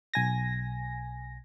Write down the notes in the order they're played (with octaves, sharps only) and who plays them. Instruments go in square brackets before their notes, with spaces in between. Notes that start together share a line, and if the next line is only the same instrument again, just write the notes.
[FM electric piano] B1 G#5 A#6